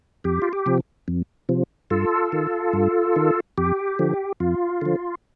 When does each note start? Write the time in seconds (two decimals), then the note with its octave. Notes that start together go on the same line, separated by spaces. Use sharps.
0.24 F2 G4
0.42 F4
0.53 G4
0.66 C3 F3
1.08 F2
1.49 C3 F3
1.90 G2 F4 A4
2.32 D#3
2.73 G2
3.16 D#3
3.58 F2 G4
3.99 D3 F3
4.40 F2 F4
4.81 D3 F3